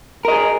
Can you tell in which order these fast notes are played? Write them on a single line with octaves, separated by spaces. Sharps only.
A#4 D#5 G#4